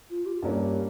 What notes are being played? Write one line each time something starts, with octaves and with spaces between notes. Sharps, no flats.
F4
G4
G2 G3 A#3 C#4